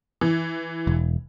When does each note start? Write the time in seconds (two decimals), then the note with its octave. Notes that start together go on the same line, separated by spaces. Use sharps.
0.21 E3
0.87 E1